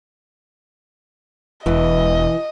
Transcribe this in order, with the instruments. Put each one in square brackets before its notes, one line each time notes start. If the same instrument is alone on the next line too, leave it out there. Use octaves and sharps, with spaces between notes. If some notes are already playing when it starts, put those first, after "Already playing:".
[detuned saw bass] E1 [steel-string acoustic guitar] E3 B4 [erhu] D#5